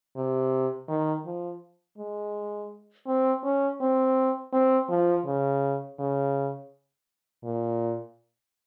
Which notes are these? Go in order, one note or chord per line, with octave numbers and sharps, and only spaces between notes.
C3
D#3
F3
G#3
C4
C#4
C4
C4
F3
C#3
C#3
A#2